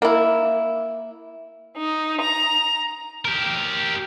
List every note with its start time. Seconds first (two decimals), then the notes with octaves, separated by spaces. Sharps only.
0.02 A#3 E4
1.77 D#4
2.21 A#5
3.25 G4 A#4